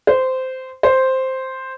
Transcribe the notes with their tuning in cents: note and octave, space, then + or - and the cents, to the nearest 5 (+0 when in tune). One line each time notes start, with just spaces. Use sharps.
C5 -15
C5 +0